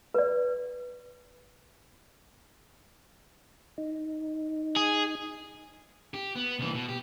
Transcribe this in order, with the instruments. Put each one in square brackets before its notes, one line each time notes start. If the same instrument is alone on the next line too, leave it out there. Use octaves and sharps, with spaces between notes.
[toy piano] B4 D5
[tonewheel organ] D#4
[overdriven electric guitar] G#4
[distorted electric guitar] G4
B3
C2 E3
B2
G4